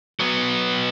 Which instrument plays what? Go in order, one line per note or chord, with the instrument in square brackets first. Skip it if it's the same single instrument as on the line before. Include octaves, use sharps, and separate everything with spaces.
[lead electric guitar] F#3 B3